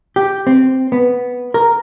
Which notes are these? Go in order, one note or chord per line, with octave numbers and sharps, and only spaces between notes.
G4
C4
B3
A#4